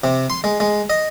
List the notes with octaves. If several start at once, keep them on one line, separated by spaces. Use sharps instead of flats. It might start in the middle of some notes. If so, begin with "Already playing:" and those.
C3
C6
G#3
G#3
D#5